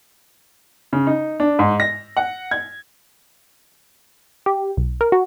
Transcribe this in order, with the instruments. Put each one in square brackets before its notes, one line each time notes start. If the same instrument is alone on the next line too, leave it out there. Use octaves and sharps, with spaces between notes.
[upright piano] C#3
D#4
D4
G#2
A#6
F#5
G#6
[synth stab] G4
B1
A#4
F#4